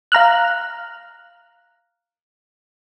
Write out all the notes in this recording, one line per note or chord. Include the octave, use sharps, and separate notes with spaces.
F5 A#5 F6 F#6